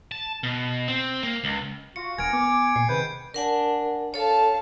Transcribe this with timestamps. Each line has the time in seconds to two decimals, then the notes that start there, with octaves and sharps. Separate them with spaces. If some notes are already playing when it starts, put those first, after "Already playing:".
0.12 A5
0.43 B2
0.88 C4
1.23 A#3
1.44 C#2
1.96 F4 F#4 C#7
2.18 D#1 B3 D4 A#4 G#5 G#6 D7
2.33 B3 D6
2.76 A#2 C7
2.89 G#2 C3 D#3 B4 G6
3.34 D4 A#4 F#5 G#5
4.14 A4 C#5 F5 A5